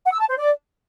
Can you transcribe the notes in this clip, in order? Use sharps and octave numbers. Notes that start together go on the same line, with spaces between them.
F#5
E6
A5
C5
D5